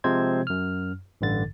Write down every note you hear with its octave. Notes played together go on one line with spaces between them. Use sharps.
C3 F3 G#3 C4 C5 G#6
F#2 F6
A1 G2 D3 A6